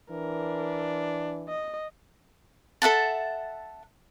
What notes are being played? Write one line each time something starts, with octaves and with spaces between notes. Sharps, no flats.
E3 D4 A#4
D#5
A4 E5 F#5 A5